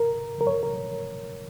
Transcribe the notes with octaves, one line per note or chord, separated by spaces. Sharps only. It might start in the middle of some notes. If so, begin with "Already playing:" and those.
Already playing: A#4
A#4
C#5
A#4